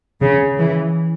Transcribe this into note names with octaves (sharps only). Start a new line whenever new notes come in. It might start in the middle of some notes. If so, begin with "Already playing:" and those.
C#3
E3